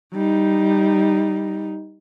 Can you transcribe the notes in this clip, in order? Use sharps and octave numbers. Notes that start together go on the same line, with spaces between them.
G3 D#4